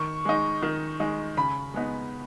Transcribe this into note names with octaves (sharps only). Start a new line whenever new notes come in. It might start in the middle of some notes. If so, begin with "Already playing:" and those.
Already playing: D#3 C#6
G#3 D#4
D#3
G#3 D#4
C#3 B5
G#3 B3 D#4